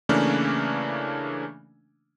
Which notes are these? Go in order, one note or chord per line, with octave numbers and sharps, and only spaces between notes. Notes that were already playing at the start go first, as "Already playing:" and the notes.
C#3 E3 A3 A#3 C#4 D4